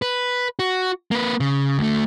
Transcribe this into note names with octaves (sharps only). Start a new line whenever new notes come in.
B4
F#4
A#3 B4
C#3
D2 A3